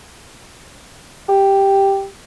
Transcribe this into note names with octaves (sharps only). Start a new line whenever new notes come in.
G4